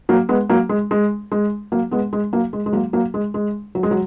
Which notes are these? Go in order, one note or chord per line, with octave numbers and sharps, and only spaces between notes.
F#3 A#3
G#3 B3
F#3 A#3
G#3
G#3
G#3
F#3 A#3
G#3 B3
G#3
F#3 A#3
G#3
G#3
F#3 A#3
F#3 A#3
G#3
G#3
F#3
G#3
F#3